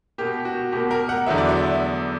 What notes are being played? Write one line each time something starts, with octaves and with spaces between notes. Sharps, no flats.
B2 A#3 G4
F#4
B2 A#3 G4
A#4
F#5
E2 D3 F#3 B3 E5
D5
E5